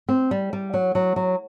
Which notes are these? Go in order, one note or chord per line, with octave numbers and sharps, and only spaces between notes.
C4
G3
G3
F#3
F#3
F#3